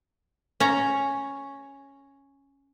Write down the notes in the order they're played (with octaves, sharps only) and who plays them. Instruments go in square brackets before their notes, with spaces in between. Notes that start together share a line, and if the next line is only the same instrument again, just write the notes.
[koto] C#4 C#5 A#5